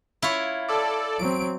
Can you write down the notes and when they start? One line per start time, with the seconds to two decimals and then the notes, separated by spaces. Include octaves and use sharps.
0.22 E4 F4 C#5
0.68 A4 D5
1.19 F#3 C4 D7